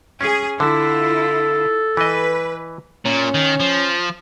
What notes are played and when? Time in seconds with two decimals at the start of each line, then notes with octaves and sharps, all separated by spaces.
0.21 C#4 G#4
0.60 D3 E4 F4 A4
1.97 E3 B4 D#5
3.06 A#2 C#4
3.34 D#3
3.60 F3